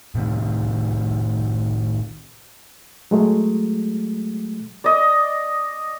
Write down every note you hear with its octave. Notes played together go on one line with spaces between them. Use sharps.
A2 C3 D#3
F#3 G#3 A3
D5 D#5